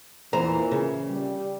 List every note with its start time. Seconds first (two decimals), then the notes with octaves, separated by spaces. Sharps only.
0.33 E2 A#2 E3 C5 A#5
0.71 C#3
1.09 G3